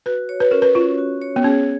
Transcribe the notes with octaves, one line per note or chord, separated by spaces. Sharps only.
F#4 B4
C#5
B4
C#4 A#4
B4
C#4 F4
F#4
C#5
B3
C#4 G#4